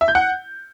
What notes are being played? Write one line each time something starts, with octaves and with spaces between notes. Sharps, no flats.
E5
G6
F#5